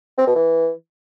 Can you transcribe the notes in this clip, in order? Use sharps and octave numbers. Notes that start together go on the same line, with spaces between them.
C4
B2
E3